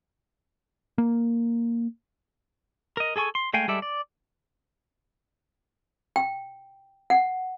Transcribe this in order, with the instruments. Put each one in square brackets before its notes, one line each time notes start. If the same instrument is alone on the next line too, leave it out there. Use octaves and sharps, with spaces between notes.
[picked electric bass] A#3
[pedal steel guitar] A#4 D#5
G#4 A4 G#5 C#6
C6
G#3 A3 F5 G5 G#5
G3 G#3 A4 D5 E5
D5
[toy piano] G5
F#5